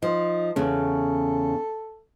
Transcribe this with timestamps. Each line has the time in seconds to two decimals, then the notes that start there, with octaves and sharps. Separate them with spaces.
0.02 F3 D#4
0.56 E2 C#3 C#4 A4